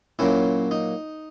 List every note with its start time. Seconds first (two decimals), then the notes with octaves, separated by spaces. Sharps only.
0.19 A#2 F#3 A#3 C#4 E4
0.71 D#4